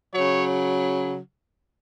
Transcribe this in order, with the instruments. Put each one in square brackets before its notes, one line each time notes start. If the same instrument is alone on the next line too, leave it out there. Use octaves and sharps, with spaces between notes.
[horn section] C#3 F#3 C#5